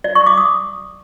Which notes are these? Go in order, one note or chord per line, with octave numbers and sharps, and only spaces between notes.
D5
C#6
D6
D#6